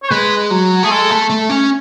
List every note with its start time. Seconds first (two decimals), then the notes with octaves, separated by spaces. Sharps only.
0.03 C#5
0.11 G#3 B4
0.51 F#3
0.83 A3 G#4
0.91 G#3 A4
1.10 A3
1.30 A3
1.50 C#4